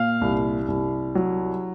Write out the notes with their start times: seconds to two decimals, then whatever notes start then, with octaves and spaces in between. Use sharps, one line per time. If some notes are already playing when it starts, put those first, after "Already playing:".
Already playing: A#2 F5
0.21 C2
0.68 C2
1.15 F#3